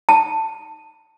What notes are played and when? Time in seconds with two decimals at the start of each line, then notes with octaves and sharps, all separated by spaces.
0.09 A5